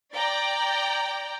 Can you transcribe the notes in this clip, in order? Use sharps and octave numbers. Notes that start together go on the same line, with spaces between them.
D5 G5 A#5